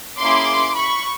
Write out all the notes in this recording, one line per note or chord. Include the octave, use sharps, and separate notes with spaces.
A#3 C#4 E4 G#4 C6 D6
B5 C#6